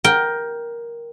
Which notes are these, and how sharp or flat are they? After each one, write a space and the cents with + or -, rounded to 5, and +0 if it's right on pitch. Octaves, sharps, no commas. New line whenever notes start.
A#4 +10 G5 +0